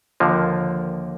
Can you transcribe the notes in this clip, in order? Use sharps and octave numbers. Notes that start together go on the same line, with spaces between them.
D#2 D3 F3 A#3